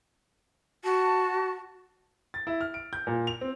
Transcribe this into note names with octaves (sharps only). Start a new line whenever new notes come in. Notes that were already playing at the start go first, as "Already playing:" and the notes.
F#4 A5
A6
E4
F6
D7
G6
A#2
F7
C4